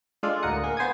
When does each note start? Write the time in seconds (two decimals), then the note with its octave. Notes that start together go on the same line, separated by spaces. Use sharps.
0.23 G#3 D4 F4 A4
0.42 D2 A2 A#4 F#5 D#6 C#7
0.64 A#3 G#4
0.77 B3 C5 G#5 D#6 G#6